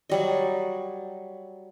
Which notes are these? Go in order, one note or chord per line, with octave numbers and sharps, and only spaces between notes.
F#3 G3 D#5